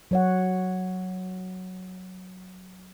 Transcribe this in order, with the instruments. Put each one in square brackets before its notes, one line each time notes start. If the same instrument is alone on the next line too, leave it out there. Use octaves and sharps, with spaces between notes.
[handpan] F#3 C#5 F#5